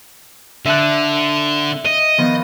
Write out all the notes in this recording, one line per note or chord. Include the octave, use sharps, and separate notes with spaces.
D3 E5 A5 F#6
D#5
D#3 F3 B3